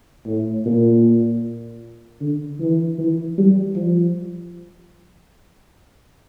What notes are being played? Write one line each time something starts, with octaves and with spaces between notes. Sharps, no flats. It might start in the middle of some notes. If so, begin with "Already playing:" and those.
A2
A#2
D3
E3
E3
G3
F3